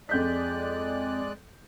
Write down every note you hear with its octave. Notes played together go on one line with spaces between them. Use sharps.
F2 G#3 D5 F#6 G6 B6